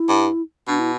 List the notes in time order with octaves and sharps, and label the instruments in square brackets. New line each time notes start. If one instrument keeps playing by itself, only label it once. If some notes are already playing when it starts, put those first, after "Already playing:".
Already playing: [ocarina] E4
[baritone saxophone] G2
[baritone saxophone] B2 [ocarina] D4
[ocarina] E4